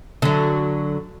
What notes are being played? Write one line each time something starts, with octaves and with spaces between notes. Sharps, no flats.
D3 F#3